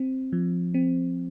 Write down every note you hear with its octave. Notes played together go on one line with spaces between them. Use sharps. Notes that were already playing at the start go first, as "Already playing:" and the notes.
Already playing: C4
F3
C4